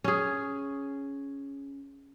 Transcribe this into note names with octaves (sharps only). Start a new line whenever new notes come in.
C#4 G#4